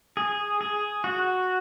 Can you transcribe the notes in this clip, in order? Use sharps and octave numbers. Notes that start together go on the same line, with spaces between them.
G#4
G#4
F#4